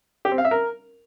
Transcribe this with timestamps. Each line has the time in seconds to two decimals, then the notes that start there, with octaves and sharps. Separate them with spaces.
0.25 G4
0.32 C4
0.38 F5
0.45 E5
0.51 A#4